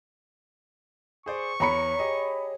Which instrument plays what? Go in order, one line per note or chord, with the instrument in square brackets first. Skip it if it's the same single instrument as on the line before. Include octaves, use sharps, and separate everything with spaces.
[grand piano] G#4 C5 D5 [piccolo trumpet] C#6
[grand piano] E2 [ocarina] C#5 [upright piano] A#5 B5 C#7
[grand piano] G4 G#4 D#5